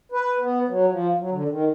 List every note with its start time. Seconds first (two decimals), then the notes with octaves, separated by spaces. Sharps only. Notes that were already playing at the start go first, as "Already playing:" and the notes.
0.12 B4
0.40 B3
0.68 F#3
0.89 F3
1.19 F#3
1.30 D3
1.48 D#3